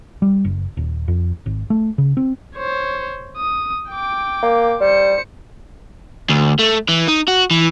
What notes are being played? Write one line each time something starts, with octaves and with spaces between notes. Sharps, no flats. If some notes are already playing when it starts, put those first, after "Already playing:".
G3
F#1
D#1
F2
G#1
A3
C#3
C4
C5 C#5
D#6
G5 D6
A#3
G3 C5 C#7
D2
A3
E3
D#4
F#4
E3